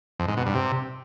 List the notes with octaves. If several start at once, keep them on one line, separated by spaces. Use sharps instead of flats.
F2
G#2
B2
G2
C3